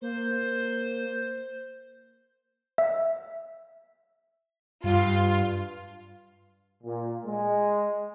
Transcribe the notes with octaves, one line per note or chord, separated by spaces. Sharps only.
A#3 C5
E5
G2 F4
A#2
G#3